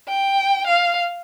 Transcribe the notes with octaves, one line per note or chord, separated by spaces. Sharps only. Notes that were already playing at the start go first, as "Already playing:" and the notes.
G5
F5